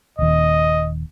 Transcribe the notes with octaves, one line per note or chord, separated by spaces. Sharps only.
D#1 D#2 D#5